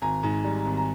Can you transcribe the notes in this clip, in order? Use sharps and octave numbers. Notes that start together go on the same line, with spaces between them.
G#1 G#5 A#5
G#2
G3
G#1
A#5